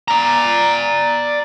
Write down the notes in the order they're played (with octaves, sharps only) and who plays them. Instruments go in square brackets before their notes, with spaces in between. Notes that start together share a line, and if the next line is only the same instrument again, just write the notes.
[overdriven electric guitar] D5 A#5